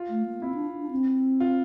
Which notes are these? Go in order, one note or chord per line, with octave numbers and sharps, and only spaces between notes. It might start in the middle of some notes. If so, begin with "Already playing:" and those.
Already playing: F4
A3
A#3
C4 E4
D4
D4
C4
F4